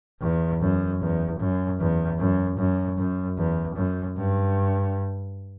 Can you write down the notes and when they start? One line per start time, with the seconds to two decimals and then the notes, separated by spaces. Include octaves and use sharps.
0.22 E2
0.61 F#2
1.01 E2
1.40 F#2
1.80 E2
2.19 F#2
2.58 F#2
2.98 F#2
3.37 E2
3.76 F#2
4.16 G2